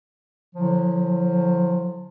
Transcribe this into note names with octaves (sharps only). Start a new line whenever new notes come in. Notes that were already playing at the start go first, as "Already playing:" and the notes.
D3 F3 F#3 E4